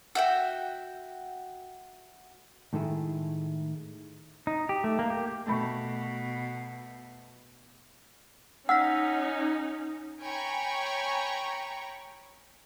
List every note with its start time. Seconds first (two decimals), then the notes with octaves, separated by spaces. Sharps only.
0.15 F#4 E5 G5
2.73 A2 D#3 G#3 A3 E4 G#4
4.47 D#4
4.69 G4
4.84 A3
4.99 A#3
5.10 G4
5.47 B2 A3 B5 C#6
8.69 C#4 D#4 F#5 E6 F6 B6
10.23 C#5 G5 G#5 A#5 B5 C#6